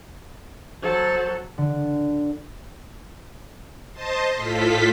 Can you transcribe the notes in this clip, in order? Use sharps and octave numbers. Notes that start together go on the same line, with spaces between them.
F#3 A4 C5
D3
C5 D#5 A5 C6
A2 F4 A4 B6